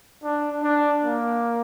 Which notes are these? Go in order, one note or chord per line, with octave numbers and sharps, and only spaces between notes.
D4
D4
A#3